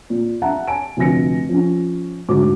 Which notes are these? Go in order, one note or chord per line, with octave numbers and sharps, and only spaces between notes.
A#2
E5 F#5 A5 A#5
G#5 A5 D7
F1 D2 G#5 A#6 C#7
F3 C#4
D2 G#2 F#4 D6